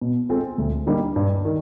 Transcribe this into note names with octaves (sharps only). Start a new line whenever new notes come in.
B2
G#3 C4 F4 A4
D2
D3 G3 A#3 D#4
G2
D#3